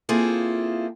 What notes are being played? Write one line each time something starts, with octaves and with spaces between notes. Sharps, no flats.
A#3 C4 E4 F4 G#4 A4